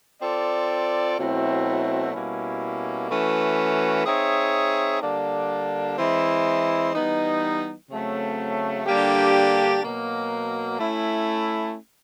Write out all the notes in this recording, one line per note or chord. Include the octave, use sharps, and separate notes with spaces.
C4 F4 A4 D5
B2 F#3 A3 C4 E4
B2 G3 A#3 C#4 E4
E3 A3 C#4 F#4 B4
C4 D#4 G#4 C#5 E5
D3 G3 A#3 D4
E3 G#3 C4 E4
E3 G3 B3 D#4
C#3 F#3 A3 C4
D3 G3 A#3 D4 G4
B2 F#3 A#3
A3 C#4 E4